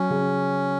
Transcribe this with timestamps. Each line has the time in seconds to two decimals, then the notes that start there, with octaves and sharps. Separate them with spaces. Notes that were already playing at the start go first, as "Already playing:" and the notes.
Already playing: F#3 C#4
0.10 C#3